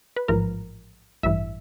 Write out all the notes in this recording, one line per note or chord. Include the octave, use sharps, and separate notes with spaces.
B4
A1 G#2 F3 A#4
A1 G2 E3 E5